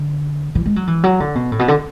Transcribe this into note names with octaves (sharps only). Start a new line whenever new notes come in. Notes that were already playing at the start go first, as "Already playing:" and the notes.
Already playing: D3
E3
G#3
F#3
E3
F#3
D3
B2
A2
B2
D3